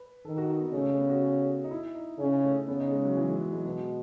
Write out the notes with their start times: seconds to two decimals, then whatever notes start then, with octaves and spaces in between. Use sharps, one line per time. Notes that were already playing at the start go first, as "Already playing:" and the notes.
Already playing: B4
0.25 D#3 A4
0.38 F#4
0.49 D#4
0.61 B3
0.73 C#3 A3
0.86 A3
0.98 B3
1.10 F#4
1.64 D#4
1.71 E4
1.95 D#4
2.19 C#3 C#4
2.44 A3
2.67 C#3 B3
2.80 D#4
2.92 G#3
3.05 F#3
3.17 E3
3.29 G#3
3.41 F#3
3.53 G#3
3.65 B2 G#3